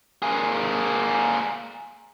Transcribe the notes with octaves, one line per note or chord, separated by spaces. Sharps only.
A#3 G#4